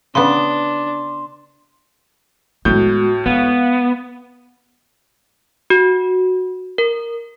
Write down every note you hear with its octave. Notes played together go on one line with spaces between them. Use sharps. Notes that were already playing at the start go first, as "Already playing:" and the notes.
C#3 B3 D4 C6
A2 G#3 B3 F#4 G6
G#3 B3 F5
F#4
A#4